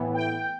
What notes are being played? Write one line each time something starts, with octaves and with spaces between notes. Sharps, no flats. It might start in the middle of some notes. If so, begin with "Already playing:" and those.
Already playing: A2 E3 B3
G5